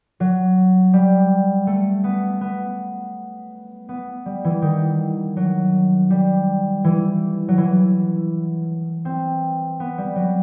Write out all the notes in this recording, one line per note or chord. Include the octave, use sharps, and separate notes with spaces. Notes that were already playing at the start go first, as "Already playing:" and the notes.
F#3
G3
A3
B3
B3
B3
G3
E3
D#3
F#3
G3
E3
F#3
E3
C4
B3
G3
F#3